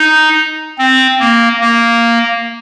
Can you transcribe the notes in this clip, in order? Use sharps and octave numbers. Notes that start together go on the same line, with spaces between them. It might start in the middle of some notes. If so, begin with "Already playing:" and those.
Already playing: D#4
C4
A#3
A#3